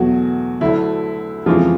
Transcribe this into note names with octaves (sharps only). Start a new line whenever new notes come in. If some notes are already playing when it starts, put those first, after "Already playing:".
Already playing: E2 B2 F#3 A3 F#4
D2 D3 F#3 A3 E4
F2 C#3 E3 F3 G#3 F4